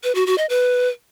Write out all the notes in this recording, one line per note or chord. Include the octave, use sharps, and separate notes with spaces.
B4
F#4
F#4
D#5
B4